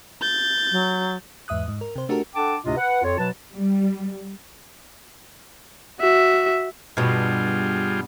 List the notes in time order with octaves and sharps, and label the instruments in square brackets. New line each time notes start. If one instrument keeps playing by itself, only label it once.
[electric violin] G6 A6
[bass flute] F#3
[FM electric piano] E2 G#2 E5 D#6 F#6
G#2
A#4
C3 C5
A3 D4 F#4 G4 A4 A#4
[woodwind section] D4 A4 F#5 G5 A5 D6
D2 A2 C3 D4 F4 D#5
B4 F#5
F2 F4 C#5
B2 F#3 B4 A5
[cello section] G3
[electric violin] F#4 E5
[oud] G2 B2 [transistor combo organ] G3 F4 G#4